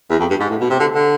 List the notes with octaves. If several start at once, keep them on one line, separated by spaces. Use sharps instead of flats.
E2
F2
G2
G#2
A2
B2
C3
D3
D3